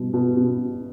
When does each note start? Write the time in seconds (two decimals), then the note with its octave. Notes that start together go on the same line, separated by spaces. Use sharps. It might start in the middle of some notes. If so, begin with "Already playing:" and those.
Already playing: B2 G3
0.14 B2
0.37 B2